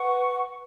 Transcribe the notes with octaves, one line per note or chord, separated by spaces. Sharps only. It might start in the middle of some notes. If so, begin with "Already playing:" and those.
Already playing: B4 F#5 C#6